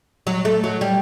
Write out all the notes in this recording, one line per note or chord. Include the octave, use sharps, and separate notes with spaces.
F#3
A3
F#3
G3